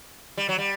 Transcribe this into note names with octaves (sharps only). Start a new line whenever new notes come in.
G3
F#3
G3